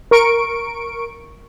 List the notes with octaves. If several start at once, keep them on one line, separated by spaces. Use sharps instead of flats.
A#4 C#6 D7